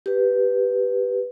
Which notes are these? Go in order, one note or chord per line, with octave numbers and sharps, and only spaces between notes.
G4 B4